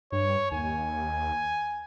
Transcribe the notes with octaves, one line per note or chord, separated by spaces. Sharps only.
G2 C#5
D#2 G#5